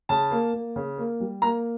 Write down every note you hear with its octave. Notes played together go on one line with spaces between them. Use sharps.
C#3 A5
A#3
A#3
C#3
A#3
G3
A#3 A#5